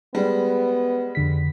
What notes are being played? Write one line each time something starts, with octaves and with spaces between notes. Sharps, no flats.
G3 G#3 B3
F2 D3 B6